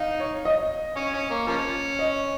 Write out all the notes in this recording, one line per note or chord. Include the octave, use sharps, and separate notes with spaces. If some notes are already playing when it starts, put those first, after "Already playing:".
Already playing: D#4 F5
C#5
D#5
C#4 C#5
C#4
A#3
F3 A#3 C#4
D#5